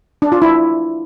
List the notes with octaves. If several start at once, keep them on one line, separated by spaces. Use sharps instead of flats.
D4
F4
E4